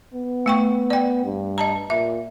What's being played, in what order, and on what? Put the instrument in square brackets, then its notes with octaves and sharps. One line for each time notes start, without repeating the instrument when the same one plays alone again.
[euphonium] B3
[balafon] A3 G5 C#6
D5 G5
[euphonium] G2
[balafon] D#5 A5 A#5
[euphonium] A#2 [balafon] E5